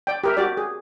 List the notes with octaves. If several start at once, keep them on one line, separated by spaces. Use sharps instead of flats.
D5 G5
G4 A#4 E5
F#4 G4 D5
G#4